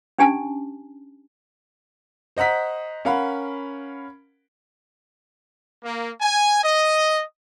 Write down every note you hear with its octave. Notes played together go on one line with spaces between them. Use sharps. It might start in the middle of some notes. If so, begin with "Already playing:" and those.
C#4 D4 G4 G#5 A5
C5 D#5 F#5 A#5 B6
C#4 A#4 F5 F#5 B5
A#3
G#5
D#5